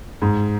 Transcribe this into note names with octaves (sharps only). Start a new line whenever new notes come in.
G#2